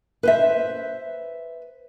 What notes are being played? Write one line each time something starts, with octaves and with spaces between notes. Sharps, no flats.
B4 C5 E5